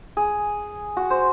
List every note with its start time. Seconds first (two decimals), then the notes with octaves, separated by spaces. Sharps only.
0.17 G#4
0.97 F#4
1.10 C5